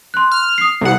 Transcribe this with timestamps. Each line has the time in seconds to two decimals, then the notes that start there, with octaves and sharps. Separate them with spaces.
0.14 C6 F#6
0.32 F6
0.58 D#6 C7
0.81 C2 F#5